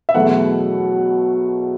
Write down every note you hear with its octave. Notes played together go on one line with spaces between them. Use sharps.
E5
E2 B2 F#3 A3 F#5